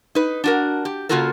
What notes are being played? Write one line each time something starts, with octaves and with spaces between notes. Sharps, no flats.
D#4 B4
D4 F#4 A#4
G4
C#3 A#3 F4 F#4 A4 A#4